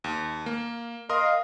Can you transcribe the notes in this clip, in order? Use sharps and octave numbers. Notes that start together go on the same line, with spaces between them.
D#2
A#3
A#4 D#5 F5 C6 D#6